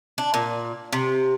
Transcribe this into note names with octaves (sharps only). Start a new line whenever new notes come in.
D4
A#2
C3